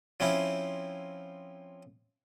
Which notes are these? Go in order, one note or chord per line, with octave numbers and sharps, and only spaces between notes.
F3 C4 C#4 E4